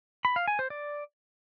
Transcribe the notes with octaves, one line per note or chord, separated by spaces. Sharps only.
B5
F5
G#5
C5
D5